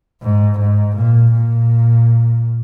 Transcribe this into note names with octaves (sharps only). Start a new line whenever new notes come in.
G#2
G#2
A#2
A#2